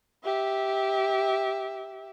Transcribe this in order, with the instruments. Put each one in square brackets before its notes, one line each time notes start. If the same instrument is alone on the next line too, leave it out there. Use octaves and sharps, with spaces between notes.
[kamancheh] G4 E5